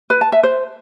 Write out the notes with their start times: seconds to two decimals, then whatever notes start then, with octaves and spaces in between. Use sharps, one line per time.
0.10 B4
0.21 A5
0.32 E5
0.43 C5